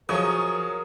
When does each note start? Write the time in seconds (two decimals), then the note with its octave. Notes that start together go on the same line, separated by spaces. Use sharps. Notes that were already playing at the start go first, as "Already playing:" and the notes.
0.09 F3 F#3 G#4 A#4 C#5 C#6 D#6